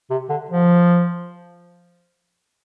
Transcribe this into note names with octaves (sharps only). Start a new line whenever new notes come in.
C3
D3
F3